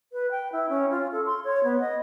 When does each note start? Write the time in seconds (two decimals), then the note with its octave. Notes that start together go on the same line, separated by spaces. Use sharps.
0.13 B4
0.31 G5
0.52 E4
0.69 C#4
0.91 F4
1.12 A4
1.26 C6
1.44 C#5
1.64 B3
1.80 D#5